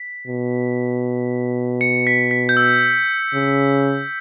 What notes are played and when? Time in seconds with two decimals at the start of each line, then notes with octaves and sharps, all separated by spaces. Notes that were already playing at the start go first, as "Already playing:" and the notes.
Already playing: B6
0.27 B2
1.81 C#7
2.07 B6
2.31 B6
2.49 G6
2.57 E6
3.34 C#3